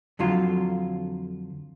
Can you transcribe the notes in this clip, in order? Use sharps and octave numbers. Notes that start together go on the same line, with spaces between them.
F2 D3 F#3 F4